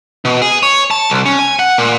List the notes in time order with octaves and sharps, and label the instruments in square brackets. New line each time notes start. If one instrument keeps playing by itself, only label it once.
[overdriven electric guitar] B2
G#4
C#5
A5
C2
C#4
G#5
F#5
A#2